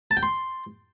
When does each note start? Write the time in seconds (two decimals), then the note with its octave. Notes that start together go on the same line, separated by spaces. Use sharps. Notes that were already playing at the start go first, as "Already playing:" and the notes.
0.11 A5
0.17 G5
0.23 C6